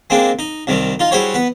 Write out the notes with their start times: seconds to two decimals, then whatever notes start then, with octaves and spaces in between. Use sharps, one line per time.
0.10 G#3 A#3 C4 D4
0.39 D#4
0.67 C2 C3 D#3 G3
1.00 D#4 F4
1.11 G3 E4 F#4 G#4 C5 C#5
1.34 B3 B4